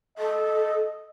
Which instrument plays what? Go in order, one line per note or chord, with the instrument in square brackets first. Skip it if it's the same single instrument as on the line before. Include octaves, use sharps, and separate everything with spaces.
[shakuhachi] A4 [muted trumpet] D#5